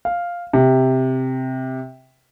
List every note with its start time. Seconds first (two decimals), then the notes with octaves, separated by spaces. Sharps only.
0.05 F5
0.53 C3